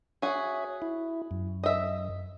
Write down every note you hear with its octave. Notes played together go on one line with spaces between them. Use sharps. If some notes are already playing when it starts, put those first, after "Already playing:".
F#4 G#4 C#5 E5
E4
F#2
D#5 E5